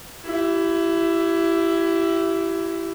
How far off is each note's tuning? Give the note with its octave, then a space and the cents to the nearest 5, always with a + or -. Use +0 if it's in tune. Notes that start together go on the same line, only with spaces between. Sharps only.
E4 +15 G4 -25